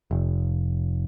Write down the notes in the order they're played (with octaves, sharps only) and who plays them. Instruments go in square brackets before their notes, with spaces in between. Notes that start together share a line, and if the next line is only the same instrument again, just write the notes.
[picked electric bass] F1